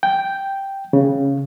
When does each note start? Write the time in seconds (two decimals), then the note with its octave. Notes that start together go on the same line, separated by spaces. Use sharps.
0.03 G5
0.93 C#3